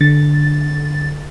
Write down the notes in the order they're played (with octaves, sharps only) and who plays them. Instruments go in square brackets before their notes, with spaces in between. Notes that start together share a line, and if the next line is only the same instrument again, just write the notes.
[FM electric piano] D3 A6